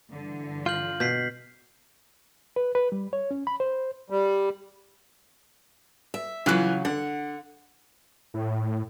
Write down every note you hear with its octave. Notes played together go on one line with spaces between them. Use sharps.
G2 D3 E3
F4 F6 G6 F#7
B2 G6 B6 C7
B4
B4
G3
C#5
C#4
B5
C5
G3
E5
C#3 E3 F#3 F4 F#6
D3 F#5
A2